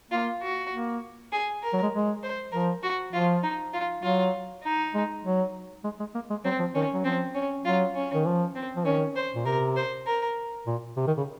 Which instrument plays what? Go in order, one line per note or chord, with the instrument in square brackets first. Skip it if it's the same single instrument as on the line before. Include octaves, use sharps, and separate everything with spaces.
[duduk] A#3 [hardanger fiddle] F4
[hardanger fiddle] F#4
[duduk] A#3
[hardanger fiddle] G#4
A#4
[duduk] F#3
G#3
G#3
[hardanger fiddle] C5
[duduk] F3 [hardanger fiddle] A#4
[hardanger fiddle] F#4
[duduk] F3 [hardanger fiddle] F4
[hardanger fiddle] D#4
F4
[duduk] F#3 [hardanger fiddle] F4
[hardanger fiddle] D#4
[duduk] G#3
F#3
G#3
G#3
A#3
G#3
[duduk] F#3 [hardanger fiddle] C4
[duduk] F3
[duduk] D#3 [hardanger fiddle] C#4
[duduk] F#3
[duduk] F3 [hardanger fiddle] C4
[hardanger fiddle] C#4
[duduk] F#3 [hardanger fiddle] F4
[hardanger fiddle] C#4
[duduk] D#3
F3
[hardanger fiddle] C4
[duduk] F3
[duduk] D#3 [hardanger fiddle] C#4
[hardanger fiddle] C5
[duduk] A#2
[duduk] C3 [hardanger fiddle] A#4
[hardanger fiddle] C5
A#4
[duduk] A#2
C3
D#3
C#3